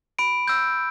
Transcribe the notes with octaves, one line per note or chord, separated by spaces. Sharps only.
B5 D7
E6 G6